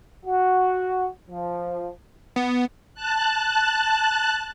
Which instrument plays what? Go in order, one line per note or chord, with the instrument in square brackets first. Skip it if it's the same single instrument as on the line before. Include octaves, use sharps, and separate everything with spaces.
[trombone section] F#4
F3
[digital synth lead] B3
[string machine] A5 F#6